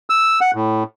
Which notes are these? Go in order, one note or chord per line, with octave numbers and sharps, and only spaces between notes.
E6
F#5
A2